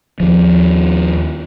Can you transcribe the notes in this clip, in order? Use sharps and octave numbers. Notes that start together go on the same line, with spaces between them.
D#2 F3